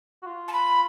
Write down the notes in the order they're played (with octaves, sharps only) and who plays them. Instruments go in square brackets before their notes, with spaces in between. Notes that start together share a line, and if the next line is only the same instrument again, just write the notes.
[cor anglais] F#4
F4
[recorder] A5
B5